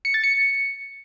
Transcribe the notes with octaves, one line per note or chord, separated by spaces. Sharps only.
C#7
A6
C#7